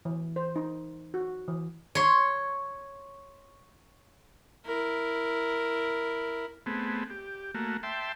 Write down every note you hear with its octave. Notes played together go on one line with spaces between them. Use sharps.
E3
C5
D#4
F#4
E3
C#5 C6
E4 A#4
A3 B3 C4 G#4
G4
A3 A#3 F#4
E5 G5 A5 C6